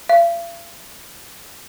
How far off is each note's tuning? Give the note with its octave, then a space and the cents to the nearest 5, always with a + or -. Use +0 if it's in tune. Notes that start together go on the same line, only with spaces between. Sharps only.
F5 -45